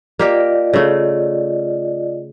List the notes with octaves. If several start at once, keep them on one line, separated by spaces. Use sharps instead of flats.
A#3 F4 G4 A#4 D5 D#5
C#3 A3